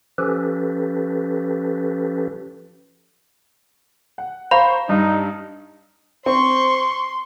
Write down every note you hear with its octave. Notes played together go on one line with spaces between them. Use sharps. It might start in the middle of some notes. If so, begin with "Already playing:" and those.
F3 C#4 G4 A4 B4
F#5
C5 F5 A#5 B5 C#6
G2 D#4
C4 C5 C6 C#6